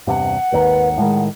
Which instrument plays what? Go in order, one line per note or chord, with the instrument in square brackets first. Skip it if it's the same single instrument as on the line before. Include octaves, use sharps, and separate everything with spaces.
[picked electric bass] E2 G2 C3 [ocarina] F#5
[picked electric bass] G#1 D#2 D#3 [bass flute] B4
[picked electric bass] A2 D#3 [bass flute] G#3